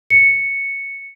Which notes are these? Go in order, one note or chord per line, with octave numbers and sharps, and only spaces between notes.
C#7